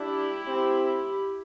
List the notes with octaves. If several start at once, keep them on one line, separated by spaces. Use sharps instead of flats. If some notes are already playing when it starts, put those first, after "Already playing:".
Already playing: D4 E4 G4
C4